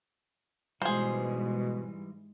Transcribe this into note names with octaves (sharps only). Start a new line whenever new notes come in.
G#2 B2 E3 G3 G#3 G#4 C5